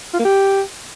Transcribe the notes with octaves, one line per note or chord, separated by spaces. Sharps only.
F4
A#3
G4